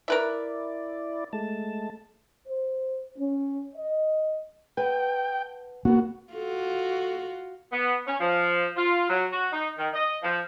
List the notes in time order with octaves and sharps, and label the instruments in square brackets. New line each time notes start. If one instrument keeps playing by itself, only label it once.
[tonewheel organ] E4 D5 [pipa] A#4 B4 E5
[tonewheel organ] G#3 A3 A5
[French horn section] C5
C#4
D#5
[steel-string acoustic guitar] B4 F#5 A5 [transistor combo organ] G5
[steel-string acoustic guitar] C#3 B3 A#4 [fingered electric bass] A#3 [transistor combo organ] F#4
[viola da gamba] F4 F#4 [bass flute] A4
[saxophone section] B3
C#4
F3
F4
F#3
F#4
D#4
D#3
D#5
F3